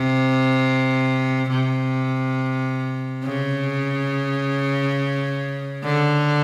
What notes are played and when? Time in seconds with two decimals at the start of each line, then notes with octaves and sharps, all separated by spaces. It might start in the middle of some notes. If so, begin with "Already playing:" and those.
Already playing: C3
1.51 C3
3.24 C#3
5.84 D3